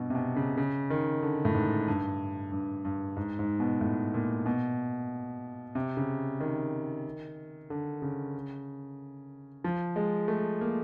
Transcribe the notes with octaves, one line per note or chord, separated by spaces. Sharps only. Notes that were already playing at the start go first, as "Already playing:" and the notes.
Already playing: G2 B2
C3
B2
C#3
C#3
D#3
D3
A2
G#2
G2
G2
G2
G#2
G#2
B2
A2
A#2
B2
C3
C#3
D#3
D3
C#3
F3
G#3
A3
A#3